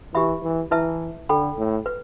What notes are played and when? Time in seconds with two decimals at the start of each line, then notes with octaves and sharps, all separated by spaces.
0.14 E3 G4 E5 B5
0.42 E3
0.71 E3 E4 B4 E5 A5
1.29 D3 A4 G5 B5
1.58 A2
1.86 B4